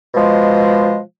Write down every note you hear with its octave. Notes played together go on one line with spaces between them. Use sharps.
B2 F3 G#3